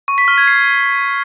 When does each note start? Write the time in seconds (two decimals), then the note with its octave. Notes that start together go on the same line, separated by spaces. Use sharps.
0.08 C#6
0.18 B6
0.28 F6
0.38 G#6
0.48 C7